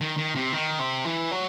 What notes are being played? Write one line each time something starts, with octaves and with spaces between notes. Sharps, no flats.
D#3
D#3
C3
D#3
C3
E3
F#3